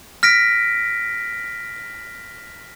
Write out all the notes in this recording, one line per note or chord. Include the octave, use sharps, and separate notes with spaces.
F6 A#6 B6 D7